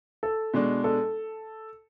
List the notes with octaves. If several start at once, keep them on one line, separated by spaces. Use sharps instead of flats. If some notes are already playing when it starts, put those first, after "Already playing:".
A4
B2 G#3 D4
A4